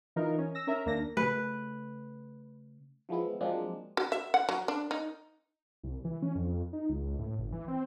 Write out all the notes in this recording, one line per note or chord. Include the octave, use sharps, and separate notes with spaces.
E3 D#4 F4 A#4
C#4
E6 A#6
C#4 A#4 E5 A#5
D#2 A#3 D4 A#6
C#3 A3 B4
E3 F3 G#3 B3 E4
F3 F#3 G#3 A#3 C4 D4
F#4
E5
F#5
F#3
D4
D#4
C2
E3
C#4
F2
D#4
C#2
A2
G1
E3
C4